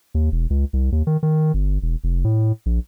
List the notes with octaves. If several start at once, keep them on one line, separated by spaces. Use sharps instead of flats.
D#2
E1
C#2
C2
D#2
D#3
D#3
G1
E1
F1
A2
A#1